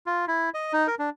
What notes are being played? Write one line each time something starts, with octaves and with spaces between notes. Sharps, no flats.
F4
E4
D#5
D#4
A#4
D4